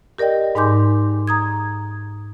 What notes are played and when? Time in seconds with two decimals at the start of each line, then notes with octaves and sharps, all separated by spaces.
0.18 G4 A#4 D5 D#5 G5
0.55 G#2 D#4 G#5 C6 D6 G6
1.27 A#5 D#6 G#6